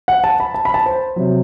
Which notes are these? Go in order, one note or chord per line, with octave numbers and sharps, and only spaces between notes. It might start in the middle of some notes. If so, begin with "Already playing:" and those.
F#5
A5
B5
A5
B5
A5
C5
C3 F#3